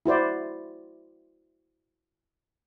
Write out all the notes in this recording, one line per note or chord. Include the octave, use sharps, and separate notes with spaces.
E4 F#4 C5 D5